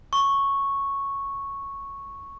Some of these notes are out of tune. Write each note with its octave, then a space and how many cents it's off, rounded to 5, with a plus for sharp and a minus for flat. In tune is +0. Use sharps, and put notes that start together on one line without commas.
C#6 -5